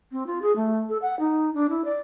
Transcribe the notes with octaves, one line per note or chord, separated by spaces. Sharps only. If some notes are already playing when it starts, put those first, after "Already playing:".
C4
F4
G#4
A3
A4
F#5
D#4
D4
E4
D5